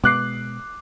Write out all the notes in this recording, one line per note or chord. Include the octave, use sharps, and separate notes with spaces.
B2 G#3 B3 D6 F#6 C7